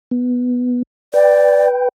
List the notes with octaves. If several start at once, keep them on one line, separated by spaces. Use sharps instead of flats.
B3
B4 D5 G5